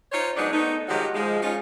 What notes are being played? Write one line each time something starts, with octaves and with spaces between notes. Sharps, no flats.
D#4 F4 C5 C#5
F#3 G#3 B3 D4 D#4
A3 B3 C4 D#4
D#3 F3 F#3 G#3 F#4 G4
F3 G#3
C#4 D#4 F4